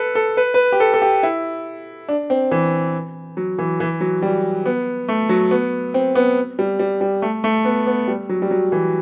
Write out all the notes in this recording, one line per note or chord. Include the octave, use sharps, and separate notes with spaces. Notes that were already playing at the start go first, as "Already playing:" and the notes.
Already playing: A4 B4
A4
B4
B4
G4
A4
A4
G4
E4
D4
C4
E3
F#3
E3
E3
F#3
G3
B3
A3
F#3
B3
C4
B3
G3
G3
G3
A3
A3
B3
B3
G3
F#3
G3
F#3
E3